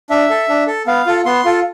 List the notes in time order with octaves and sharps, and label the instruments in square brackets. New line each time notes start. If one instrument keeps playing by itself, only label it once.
[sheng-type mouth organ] D4 E5
A4
D4
A4
B3 F5
F4 A4
B3 C6
F4 A4